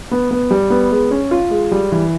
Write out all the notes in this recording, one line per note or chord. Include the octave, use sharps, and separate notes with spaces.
B3
B3
G3
B3
G#3
C#4
F4
G#3
G3
E3